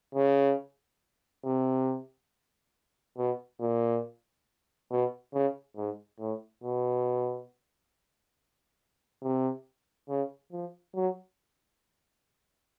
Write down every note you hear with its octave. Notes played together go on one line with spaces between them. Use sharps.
C#3
C3
B2
A#2
B2
C#3
G#2
A2
B2
C3
C#3
F3
F#3